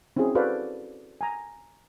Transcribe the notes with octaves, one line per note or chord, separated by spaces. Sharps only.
C4 C#4 E4 F#4 G#4
F#4 A4 B4 C5 D5 F5
G#5 A#5